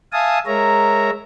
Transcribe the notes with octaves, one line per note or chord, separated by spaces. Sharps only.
E5 F5 G#5 A5 D#6
G#3 A#4 C#5 E5 A#5